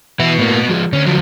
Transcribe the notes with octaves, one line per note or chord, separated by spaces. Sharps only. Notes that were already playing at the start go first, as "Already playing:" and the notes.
E3 B3 E4 F#4
A2 A#3
F3 G#3
D2 C#4
F3 F#3